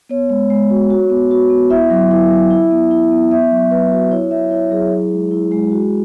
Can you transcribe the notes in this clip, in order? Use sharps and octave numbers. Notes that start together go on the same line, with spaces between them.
B3 C#5
G#3
G#3
F#4
F#4
B3
F#4
B3
E4 E5
F#3
E4
F#3
E4
B3
E4
B3
B3 E5
F#3
F#3 B4
F#4
E4 C#5
F#3 E5
E4 C#5
F#3 G#4
E4
G#3
E4
G#3
F#4